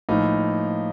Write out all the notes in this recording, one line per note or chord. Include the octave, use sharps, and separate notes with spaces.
A2 F3 A#3 D#4